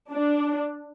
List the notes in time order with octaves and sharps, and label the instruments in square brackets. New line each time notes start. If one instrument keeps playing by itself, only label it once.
[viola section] D4